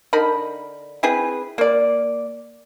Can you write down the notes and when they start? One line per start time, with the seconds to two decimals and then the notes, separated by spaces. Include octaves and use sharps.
0.13 D3 D#4 A#4 B5
1.03 C4 E4 G#4 B4
1.58 A#3 D5